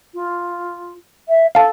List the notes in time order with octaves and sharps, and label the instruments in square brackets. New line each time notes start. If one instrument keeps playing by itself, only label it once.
[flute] F4
E5
[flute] A4 [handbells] F5 A5